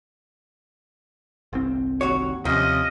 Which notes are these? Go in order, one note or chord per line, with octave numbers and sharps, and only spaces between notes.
G1 C2 C4
D#2 F#4 C#5
D#2 C3 F3 C#4 D#5